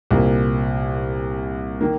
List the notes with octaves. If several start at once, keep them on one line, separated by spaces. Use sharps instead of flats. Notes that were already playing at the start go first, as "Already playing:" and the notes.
C2 A#2 A#3
D#3 A#3